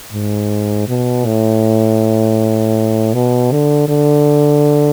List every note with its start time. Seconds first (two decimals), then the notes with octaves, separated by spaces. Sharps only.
0.13 G#2
0.88 B2
1.26 A2
3.14 B2
3.51 D3
3.89 D3